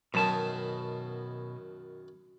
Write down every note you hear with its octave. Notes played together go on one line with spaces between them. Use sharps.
F#2 B2 D#3 A5